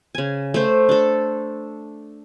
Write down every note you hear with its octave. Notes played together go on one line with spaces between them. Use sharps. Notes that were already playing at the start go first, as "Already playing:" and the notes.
C#3 G#5
A3 C5
D4 A4